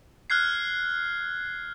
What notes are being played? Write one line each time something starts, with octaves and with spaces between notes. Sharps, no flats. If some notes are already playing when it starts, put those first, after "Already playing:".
F6 F#6 G#6 C7